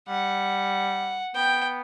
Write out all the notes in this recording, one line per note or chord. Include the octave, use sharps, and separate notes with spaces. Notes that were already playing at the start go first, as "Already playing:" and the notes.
G3 F#5
B3 G5